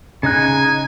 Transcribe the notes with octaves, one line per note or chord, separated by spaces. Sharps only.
C#3 D#4 G#5 F#6